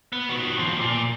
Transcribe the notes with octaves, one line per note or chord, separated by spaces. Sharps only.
B3
D#3 F#4
D#2 F3
A#2